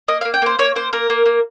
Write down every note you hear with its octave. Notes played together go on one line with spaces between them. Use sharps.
A#3 D#5
F5
A#3
G5
A#3 C5
A#3 C#5
A#3 C5
A#3 A#4
A#3
A#3